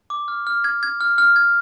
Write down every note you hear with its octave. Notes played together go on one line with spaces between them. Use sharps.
D6
F6
F6
G#6
G#6
F6
F6
G#6